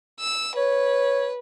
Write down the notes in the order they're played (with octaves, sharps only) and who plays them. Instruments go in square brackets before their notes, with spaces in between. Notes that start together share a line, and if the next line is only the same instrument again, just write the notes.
[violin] E6
[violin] B4 [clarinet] C#5